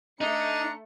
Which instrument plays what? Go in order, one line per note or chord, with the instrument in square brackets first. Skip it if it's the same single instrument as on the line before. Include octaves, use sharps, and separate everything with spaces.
[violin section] A3 C#7 [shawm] D4 [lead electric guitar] D#4 [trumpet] A#5